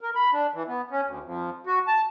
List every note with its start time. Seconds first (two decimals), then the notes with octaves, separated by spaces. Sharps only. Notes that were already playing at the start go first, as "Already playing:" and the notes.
0.01 A#4
0.15 B5
0.33 D4
0.54 E3
0.68 B3
0.91 C#4
1.04 D2
1.23 F2
1.67 F#4
1.87 A5